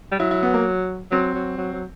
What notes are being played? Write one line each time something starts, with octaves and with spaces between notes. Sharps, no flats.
G3
F#3 E4
E4
B3
A#3
F#3 C4
F#3
F#3
F#3